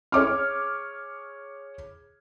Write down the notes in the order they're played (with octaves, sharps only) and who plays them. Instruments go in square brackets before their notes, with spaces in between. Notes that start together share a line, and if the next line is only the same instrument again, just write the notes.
[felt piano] G#4 C#5 D6 F6